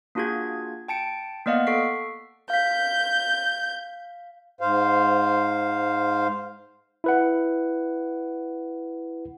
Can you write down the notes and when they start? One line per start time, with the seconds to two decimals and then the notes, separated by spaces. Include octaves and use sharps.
0.15 A#3 D4 F4 F#4 G#4 G#6
0.88 G5 A5 C#7 D7
1.46 A#3 B3 D5 D#5 F5 F#5
1.67 A4 C#6 B6 C7
2.50 F5 G6 B6
4.61 G#2 C5 F5
7.04 E4 B4 F#5